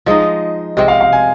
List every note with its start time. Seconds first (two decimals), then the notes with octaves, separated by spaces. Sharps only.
0.06 F3 G#3 D#4 D#5
0.77 C3 G#3 C4 D#5
0.88 F5
1.01 F5
1.13 G#5